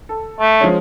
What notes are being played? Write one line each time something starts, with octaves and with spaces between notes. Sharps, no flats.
A4
A3
F3 G#3 C#4